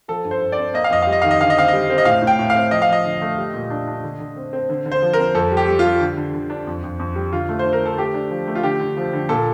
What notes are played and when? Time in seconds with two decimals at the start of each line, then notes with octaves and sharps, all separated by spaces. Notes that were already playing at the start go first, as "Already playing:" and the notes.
0.08 F3 A4
0.25 G2
0.31 C5
0.42 G2
0.52 D5
0.58 C4
0.74 A#3 D#5
0.84 F5
0.90 F2 D#5
1.02 F5
1.07 G3
1.12 D#5
1.22 D#3 F5
1.31 D#5
1.40 D3 F5
1.50 D#5
1.57 C4 F5
1.68 G3 D#5
1.90 C4
1.98 D#5
2.05 A2 F5
2.22 A2
2.27 G5
2.39 A2
2.50 F5
2.55 C4
2.71 F3 D#5
2.82 F5
2.88 F3 D#5
3.04 D3
3.22 A3
3.38 G3
3.54 A#2
3.70 D4
3.87 D4
4.03 D3
4.20 D3
4.36 C4
4.53 C4
4.69 D3
4.86 D3
4.92 C5
5.02 F3
5.13 C4 A#4
5.35 F2 A4
5.51 G3
5.57 G4
5.68 G3
5.79 G3 F4
6.00 D3
6.17 D3
6.34 D3
6.50 D4
6.67 F2
6.83 F2
6.99 F2
7.16 G3
7.32 D3 F4
7.49 A3
7.59 C5
7.65 D3
7.73 A#4
7.82 D3 A4
7.98 A3 G4
8.14 D4
8.31 F3
8.47 A3
8.55 F4
8.63 D3 G4
8.80 D3
8.97 F3
9.13 D3
9.29 A#2 A4